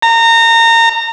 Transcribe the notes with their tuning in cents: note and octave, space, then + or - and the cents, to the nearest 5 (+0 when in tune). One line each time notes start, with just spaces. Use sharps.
A#5 -25